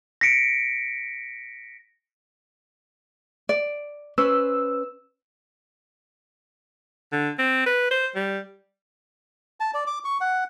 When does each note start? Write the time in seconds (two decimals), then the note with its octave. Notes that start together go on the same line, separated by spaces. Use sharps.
0.21 A#6 B6 C#7 D7
3.49 D5
4.18 C#4 B4 C5 E6
7.12 D3
7.39 C4
7.66 B4
7.91 C5
8.15 G3
9.60 A5
9.74 D5
9.87 D6
10.04 C#6
10.21 F#5